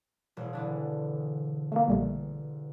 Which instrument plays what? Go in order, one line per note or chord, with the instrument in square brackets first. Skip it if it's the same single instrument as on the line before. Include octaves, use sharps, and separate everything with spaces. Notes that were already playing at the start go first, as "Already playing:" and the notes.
[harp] E1
D3 E3 D4
[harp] G1 [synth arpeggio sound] A3 A#3
[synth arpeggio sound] A#1 G3 A3